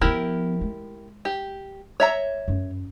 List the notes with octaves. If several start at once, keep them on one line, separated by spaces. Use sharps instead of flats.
F3 B3 E4 G4 A#4
G#3
G4
C#5 E5 A#5
F#2